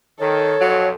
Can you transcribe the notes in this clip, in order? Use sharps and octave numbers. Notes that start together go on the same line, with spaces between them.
D#3 A4 C#5
B1 F2 F#3